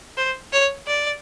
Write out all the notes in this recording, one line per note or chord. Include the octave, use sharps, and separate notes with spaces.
C5
C#5
D5